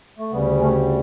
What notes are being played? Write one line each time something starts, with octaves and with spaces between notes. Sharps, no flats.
A3
D2 C#3 G3 B3
A3 C#4